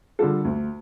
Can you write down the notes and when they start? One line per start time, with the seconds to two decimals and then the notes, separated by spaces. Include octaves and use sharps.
0.19 D3 G3 F4 A4
0.44 D2